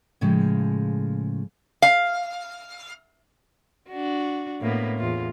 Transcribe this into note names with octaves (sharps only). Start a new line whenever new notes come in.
A2 C#3 F3 G#3
F5
D4 F#4
A2 A#3 B3
E2 A2 F4